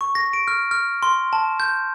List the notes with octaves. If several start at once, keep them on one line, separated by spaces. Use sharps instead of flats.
C#6
A#6
D7
F6
F6
C6
A5
G6